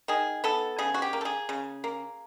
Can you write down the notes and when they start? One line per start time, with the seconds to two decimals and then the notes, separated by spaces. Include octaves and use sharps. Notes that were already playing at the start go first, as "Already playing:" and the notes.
0.08 D#3 G#4
0.44 B3 A4
0.78 C#3 G#4
0.94 F#4
1.02 G4
1.13 A#3
1.21 A4
1.25 G#4
1.49 C#3
1.84 A#3